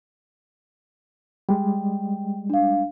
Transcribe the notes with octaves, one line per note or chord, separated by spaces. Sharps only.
G3 G#3 G5
D4 F5